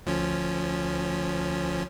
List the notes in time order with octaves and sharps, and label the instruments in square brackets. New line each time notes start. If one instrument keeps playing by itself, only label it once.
[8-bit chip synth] D2 F3 C#4